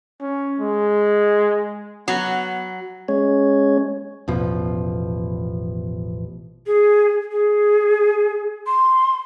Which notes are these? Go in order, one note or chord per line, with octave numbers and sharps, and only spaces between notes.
C#4
G#3
F#3 B3
G#3 C#4 C#5
A1 E2 B2 F3
G#4
G#4
C6